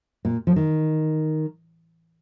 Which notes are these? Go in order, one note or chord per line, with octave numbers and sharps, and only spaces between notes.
A#2
F3
D#3